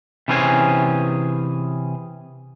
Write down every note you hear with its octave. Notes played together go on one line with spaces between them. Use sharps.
C3 E3 C#4 G#4 C5 G#5